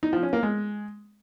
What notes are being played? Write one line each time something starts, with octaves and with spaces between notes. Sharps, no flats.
D#4
F3
C#4
A#3
G#3